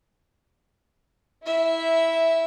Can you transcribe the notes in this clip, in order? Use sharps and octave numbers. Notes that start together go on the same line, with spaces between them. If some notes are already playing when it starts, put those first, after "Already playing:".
E4 E5